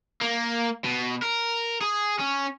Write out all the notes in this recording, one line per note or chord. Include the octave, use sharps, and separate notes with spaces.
A#3
B2
A#4
G#4
C#4